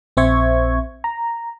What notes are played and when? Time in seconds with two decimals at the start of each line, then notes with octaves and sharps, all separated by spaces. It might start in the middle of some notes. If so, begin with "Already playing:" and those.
0.17 A#1 C4 C5 E5 C#6 G#6
1.04 A#5